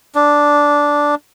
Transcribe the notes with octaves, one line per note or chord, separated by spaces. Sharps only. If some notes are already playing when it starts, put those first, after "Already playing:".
D4